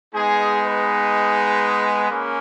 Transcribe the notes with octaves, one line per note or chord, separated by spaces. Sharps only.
G#3 B3 D#4 G#4
G#4 B4
A#3 C#4